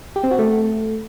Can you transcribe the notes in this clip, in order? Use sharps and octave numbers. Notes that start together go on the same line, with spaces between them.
G4
C4
F#4
A3